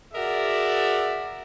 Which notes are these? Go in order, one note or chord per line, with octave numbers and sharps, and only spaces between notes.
F#4 G#4 A#4 D5 E5